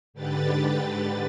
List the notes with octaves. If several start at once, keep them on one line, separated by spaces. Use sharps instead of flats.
G#2 D3 G4 B4 A6